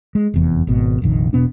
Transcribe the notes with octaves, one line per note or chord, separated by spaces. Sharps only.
G#3
F1 E2
G#1 B2
F1 A#1 D#3
E1 B2 B3 D4